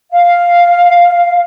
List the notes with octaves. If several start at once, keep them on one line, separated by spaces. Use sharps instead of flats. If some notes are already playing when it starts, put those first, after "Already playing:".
F5